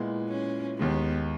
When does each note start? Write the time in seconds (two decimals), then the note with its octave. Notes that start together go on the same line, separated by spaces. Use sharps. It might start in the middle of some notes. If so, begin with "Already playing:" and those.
Already playing: A#2 G#3 B3 E4
0.29 C#4
0.79 D#2 D#3 G#3 B3